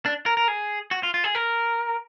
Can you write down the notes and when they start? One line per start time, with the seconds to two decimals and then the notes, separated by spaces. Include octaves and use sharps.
0.06 D4
0.26 A#4
0.37 A#4
0.48 G#4
0.91 F#4
1.03 F4
1.14 F4
1.24 G#4
1.35 A#4